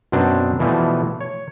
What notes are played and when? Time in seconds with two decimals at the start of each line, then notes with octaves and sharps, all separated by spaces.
0.12 F#2 B2 C4 D4
0.60 B2 E3 F3 G3 A3
1.21 C#5